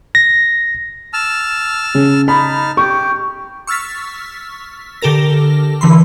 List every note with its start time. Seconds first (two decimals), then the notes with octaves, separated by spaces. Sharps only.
0.15 A#6
1.13 A5 E6 F6
1.95 C#3
2.28 D#4 A5 B5 F6
2.77 G4 C#6
3.67 C#6 E6 F6 A6 B6
5.02 D3 G4 A4 A#4 A#6
5.81 D3 E3 B5 C6